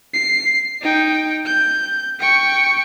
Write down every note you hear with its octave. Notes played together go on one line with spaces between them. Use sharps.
C7
D#4 G5
G6
G5 C#6